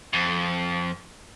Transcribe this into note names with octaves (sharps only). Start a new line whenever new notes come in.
F2